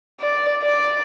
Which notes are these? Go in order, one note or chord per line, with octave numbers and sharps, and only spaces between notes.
D5
D5